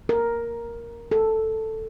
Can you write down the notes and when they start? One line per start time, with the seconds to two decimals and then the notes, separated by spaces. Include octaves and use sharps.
0.09 A#4
1.11 A4